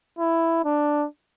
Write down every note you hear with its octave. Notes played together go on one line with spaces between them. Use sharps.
E4
D4